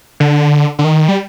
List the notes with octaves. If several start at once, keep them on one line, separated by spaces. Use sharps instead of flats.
D3
D3
D#3
G3